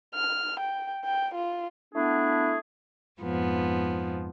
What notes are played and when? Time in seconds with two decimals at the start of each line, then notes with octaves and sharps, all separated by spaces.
0.15 F6
0.60 G5
1.04 G5
1.35 F4
1.94 A3 B3 D4 E4 G#4
3.20 F2 G#2 F3 B3